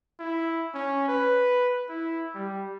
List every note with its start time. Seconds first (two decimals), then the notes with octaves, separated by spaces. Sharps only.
0.19 E4
0.75 C#4
1.08 B4
1.89 E4
2.35 G3